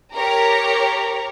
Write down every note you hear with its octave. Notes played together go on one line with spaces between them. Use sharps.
G4 A#4 C#5 A#5